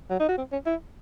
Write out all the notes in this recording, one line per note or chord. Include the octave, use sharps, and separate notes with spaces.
F#3
D#4
F#4
C4
C#4
E4